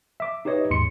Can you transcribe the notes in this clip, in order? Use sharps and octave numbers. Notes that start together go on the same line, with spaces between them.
E5 D6
D#4 G4 B4 C#5 D#5
D#2 G#2 C6 C#7